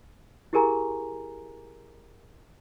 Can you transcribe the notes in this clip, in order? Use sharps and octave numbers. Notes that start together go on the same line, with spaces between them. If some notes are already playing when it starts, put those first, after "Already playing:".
E4 G4 G#4 A#4 G#5 A#5